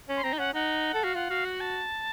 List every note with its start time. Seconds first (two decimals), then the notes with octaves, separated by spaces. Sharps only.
0.09 C#4
0.17 C6
0.24 C4 A#5
0.33 D#4
0.39 C#4 F#5
0.54 D#4 F#5
0.94 A4
1.04 F#4 F5
1.15 F4 F#5
1.30 F#4 F5
1.45 F#5
1.60 A5